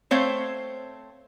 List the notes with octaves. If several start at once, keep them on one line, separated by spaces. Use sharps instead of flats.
A3 C4 C5 C#5 F5